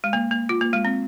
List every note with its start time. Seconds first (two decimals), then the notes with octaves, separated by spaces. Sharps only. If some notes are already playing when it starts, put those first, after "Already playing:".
0.04 G#3
0.13 A#3
0.31 A#3
0.49 F4
0.61 A#3
0.73 G#3
0.85 C4